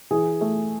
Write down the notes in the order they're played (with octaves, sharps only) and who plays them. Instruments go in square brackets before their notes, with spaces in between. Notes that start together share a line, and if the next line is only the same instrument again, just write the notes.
[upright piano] E3 G#4
A3